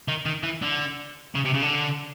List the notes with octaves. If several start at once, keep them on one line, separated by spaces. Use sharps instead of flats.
D#3
D#3
E3
D3
C#3
C3
C#3
D3